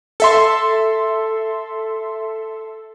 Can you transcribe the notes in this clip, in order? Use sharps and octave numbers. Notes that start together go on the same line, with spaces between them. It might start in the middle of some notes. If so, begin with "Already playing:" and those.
A4 E5 C6